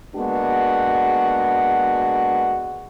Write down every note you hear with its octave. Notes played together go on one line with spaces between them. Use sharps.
G#3 A#3 B3 D4 F#4